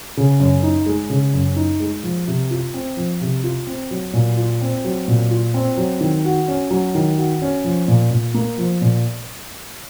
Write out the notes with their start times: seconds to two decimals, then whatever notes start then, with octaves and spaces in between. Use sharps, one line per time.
0.17 C#3
0.40 F#2
0.63 D#4
0.86 G#3
1.10 C#3
1.33 F#2
1.56 D#4
1.80 G#3
2.03 F3
2.28 C3
2.51 F4
2.74 C4
2.97 F3
3.21 C3
3.44 F4
3.67 C4
3.91 F#3
4.13 A#2
4.37 F4
4.61 C4
4.85 F#3
5.08 A#2
5.31 F4
5.54 C4
5.77 F#3
6.01 D#3
6.25 F#4
6.48 C#4
6.71 F#3
6.95 D#3
7.18 F#4
7.42 C#4
7.64 F3
7.88 A#2
8.11 A#2
8.34 A#3
8.58 F3
8.82 A#2